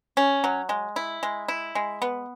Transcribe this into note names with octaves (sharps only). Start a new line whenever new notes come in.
C#4
F#3
G#3
E4
G#3
E4
G#3
B3